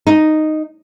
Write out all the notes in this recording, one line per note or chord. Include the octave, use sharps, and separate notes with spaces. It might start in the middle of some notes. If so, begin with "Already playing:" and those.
D#4